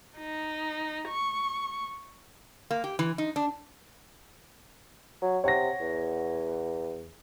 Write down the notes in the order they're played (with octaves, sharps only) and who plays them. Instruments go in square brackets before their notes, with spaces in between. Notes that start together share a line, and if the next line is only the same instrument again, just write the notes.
[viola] D#4
C#6
[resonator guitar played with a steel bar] A#3
G4
E3
D#4
D4
[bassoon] F#3
[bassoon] C3 [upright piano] C#5 F#5 A#6
[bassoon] E2